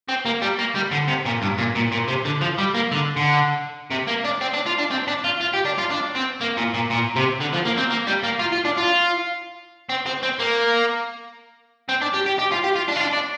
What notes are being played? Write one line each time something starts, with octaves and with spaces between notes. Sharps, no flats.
C4
A#3
G3
A#3
G3
D3
C3
A#2
G2
A#2
A#2
A#2
C3
D3
F3
G3
A#3
D3
D3
C3
A#3
D4
C4
D4
F4
D4
C4
D4
F4
F4
G4
D4
F4
D4
C4
A#3
A#2
A#2
A#2
C3
D3
F3
A#3
C4
A#3
G3
A#3
F4
F4
D4
F4
C4
C4
C4
A#3
C4
D4
G4
G4
G4
F4
G4
F4
D4
F4
D4
D4